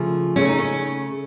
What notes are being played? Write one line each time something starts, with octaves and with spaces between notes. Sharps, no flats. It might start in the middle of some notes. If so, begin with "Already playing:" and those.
Already playing: C#3 F3 A3
C#3 A3 C#4
D#4
C#4